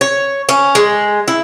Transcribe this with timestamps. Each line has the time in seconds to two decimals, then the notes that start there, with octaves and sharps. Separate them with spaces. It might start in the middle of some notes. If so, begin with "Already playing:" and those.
0.01 C#5
0.49 C#4
0.75 G#3
1.28 E4